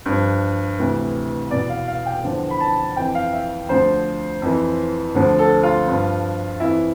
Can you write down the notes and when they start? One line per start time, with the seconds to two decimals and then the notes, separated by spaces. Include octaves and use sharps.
0.06 G2 F3
0.79 D2 C3 E3
1.51 E2 B2 D5
1.70 F5
1.87 F5
2.06 G5
2.24 E2 D3 F3
2.50 B5
2.60 A5
2.96 F2 E3 G5
3.15 F5
3.33 E5
3.69 D2 D3 F3 C5
4.42 F2 E3
5.15 D2 D3 F3
5.39 A4
5.63 F4
5.87 G2 F3
6.60 F2 E3 E4